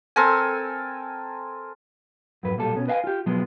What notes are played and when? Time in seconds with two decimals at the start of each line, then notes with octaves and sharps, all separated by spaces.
0.16 C4 A4 A#4 G#5
2.43 F2 G#2 F#3 B4
2.57 B1 A#2 G3 A4
2.75 B2 C#4
2.88 B4 D#5 F5 F#5 G#5
3.04 F4 G4
3.26 B2 F3 F#3 G#3 B3